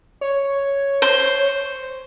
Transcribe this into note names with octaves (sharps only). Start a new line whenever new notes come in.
C#5
C5